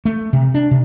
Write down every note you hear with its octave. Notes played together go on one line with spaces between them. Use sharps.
A3
C3
D4
C3